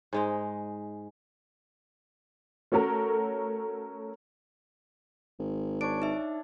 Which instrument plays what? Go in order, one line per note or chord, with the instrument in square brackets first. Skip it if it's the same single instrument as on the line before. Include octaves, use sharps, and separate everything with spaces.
[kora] G#2 G#3 D#4
[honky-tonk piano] A3 C#4 F#4 A4 A#4
[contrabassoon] G#1
[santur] D4 C#5 [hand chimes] D7
[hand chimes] D#4 E5